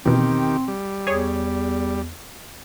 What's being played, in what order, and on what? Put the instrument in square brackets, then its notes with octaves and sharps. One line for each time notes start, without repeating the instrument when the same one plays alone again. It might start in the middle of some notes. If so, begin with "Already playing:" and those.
[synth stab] E2 B2 [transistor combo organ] D#3 G4 [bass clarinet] C4
[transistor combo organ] G3
[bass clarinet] E2 [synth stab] G#4 C#5